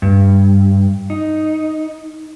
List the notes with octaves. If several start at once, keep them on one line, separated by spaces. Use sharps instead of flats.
G2
D#4